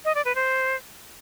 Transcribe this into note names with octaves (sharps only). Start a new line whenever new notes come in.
D#5
D5
B4
C5